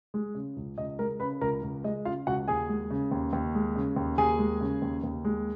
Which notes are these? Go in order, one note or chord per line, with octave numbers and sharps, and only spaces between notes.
G#3
C#3
C#2
C#2 D#5
G#3 A#4 A#5
C#3 B4 B5
C#2 A#4 A#5
C#2
G#3 D#5
C#3 F4 F5
C#2 F#4 F#5
D#2 G#4 G#5
G#3
C#3
D#2
D#2
G#3
C#3
D#2
D#2 G#4 G#5
G#3
C#3
D#2
D#2
G#3